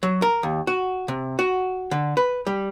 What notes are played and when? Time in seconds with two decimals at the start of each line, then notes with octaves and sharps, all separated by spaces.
0.03 F#3
0.22 A#4
0.43 D#2
0.67 F#4
1.08 C3
1.39 F#4
1.91 D3
2.17 B4
2.47 G3